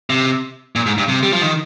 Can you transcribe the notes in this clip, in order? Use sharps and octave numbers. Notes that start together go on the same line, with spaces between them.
C3
A#2
G#2
G2
C3
G3
F3
D#3